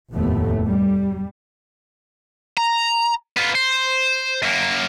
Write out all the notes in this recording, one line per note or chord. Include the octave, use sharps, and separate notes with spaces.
F1 D#2 A2 A3 B3
G3
A#5
B3 F4
C5
F#2 A#3